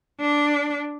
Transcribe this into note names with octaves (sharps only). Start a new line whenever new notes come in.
D4